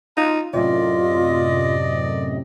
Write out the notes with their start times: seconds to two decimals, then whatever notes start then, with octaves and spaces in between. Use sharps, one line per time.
0.17 D#4 F4 A#5
0.54 F#2 A2 C3 F4 D5 D#5